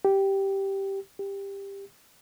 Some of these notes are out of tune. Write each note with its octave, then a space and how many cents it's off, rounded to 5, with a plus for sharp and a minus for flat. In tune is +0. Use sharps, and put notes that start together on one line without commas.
G4 -5
G4 +15